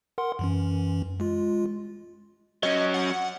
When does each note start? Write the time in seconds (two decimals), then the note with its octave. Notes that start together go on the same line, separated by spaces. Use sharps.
0.18 A#4 F#5 C6
0.39 F#2 E3 C#4
1.20 G#3 F4
2.63 F#3 C#4 D#5
2.94 F#5